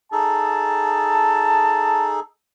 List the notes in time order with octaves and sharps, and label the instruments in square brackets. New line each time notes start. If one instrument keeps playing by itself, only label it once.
[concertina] D#4 G#4 A4 [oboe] A5